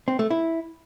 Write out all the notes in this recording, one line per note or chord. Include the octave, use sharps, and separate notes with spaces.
C4
A3
E4